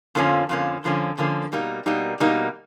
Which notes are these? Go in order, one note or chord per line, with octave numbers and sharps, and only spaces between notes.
F2 D3 F3 A#3 C#4
F2 D3 F3 A#3 C#4
F2 D3 F3 A#3 C#4
F2 D3 F3 A#3 C#4
B2 G3 A#3 D#4
B2 G3 A#3 D#4
B2 G3 A#3 D#4